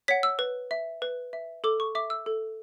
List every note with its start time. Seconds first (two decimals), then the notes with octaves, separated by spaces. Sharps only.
0.08 C#5 F#5 B6
0.23 E6
0.39 B4
0.71 E5
1.02 B4
1.33 E5
1.64 A4 D6
1.80 C#6
1.95 E5 D6
2.10 E6
2.26 A4